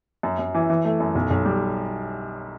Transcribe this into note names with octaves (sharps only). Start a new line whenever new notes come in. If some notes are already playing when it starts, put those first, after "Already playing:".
F#2
F#2
E3
E3
A3
F#2
B1
B1
G3